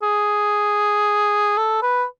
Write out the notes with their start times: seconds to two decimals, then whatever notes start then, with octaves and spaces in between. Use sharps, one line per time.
0.03 G#4
1.57 A4
1.82 B4